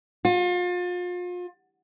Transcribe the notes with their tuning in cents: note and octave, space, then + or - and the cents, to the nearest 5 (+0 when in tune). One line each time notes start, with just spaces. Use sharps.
F4 +35